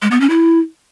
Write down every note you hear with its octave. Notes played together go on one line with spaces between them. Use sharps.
G#3
B3
C#4
E4